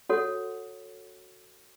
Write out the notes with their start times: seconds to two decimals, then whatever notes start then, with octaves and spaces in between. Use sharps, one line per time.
0.09 F#4 A4 C#5 F#5